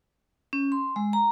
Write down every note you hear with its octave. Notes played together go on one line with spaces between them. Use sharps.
C#4
C6
G#3
A#5